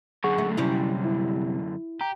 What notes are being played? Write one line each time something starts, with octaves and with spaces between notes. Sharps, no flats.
F#2 D3 G#4 F#5 C#6
A3
C3 G3 C#4 E4
E4
G4 A#5